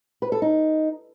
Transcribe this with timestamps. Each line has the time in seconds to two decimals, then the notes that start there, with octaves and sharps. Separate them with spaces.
0.22 B4
0.32 A4
0.42 D#4